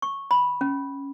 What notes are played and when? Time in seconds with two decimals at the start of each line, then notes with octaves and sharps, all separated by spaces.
0.02 C#6
0.31 B5
0.61 C#4